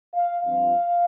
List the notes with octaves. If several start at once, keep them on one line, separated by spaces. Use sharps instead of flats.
F5
G2 F3 C4 F4 F5